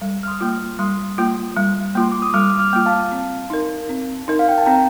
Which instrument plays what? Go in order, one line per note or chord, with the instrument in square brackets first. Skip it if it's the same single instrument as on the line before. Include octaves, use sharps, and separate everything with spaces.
[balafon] G3
[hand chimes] F6
C6 D#6
[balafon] A#3 F4
[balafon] G3 [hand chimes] C6 D#6
[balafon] A#3 F4
G3
[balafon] A#3 F4 [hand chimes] C6
[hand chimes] D6
D#6
[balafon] G3 [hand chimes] D6 F6
[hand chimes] D6 F6
[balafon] A#3 F4
[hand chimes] F5 A5
[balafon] C4
D#4 A#4
C4
D#4 A#4
[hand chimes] F5
G5
A5
[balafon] C4 [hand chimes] G5 A#5